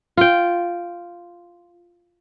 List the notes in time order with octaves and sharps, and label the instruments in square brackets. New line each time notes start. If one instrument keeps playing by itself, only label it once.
[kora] F4 G5